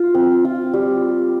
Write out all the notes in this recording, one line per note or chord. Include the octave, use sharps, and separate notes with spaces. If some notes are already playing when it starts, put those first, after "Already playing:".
Already playing: F4
C4
F4
G3